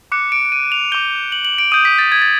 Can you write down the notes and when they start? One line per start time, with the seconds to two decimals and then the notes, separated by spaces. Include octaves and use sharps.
0.12 D6 F#6 C#7
0.32 D7
0.52 D#7
0.72 F7
0.92 D6 G6 G7
1.32 F#7
1.45 F#7
1.58 D7
1.72 D#6 G6 D#7
1.85 B6
1.99 A6
2.12 G#6
2.22 A6